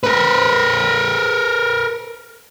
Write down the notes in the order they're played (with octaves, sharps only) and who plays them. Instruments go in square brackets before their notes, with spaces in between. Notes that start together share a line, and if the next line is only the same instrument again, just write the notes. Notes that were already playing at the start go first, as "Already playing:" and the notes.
[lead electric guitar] A#4 B4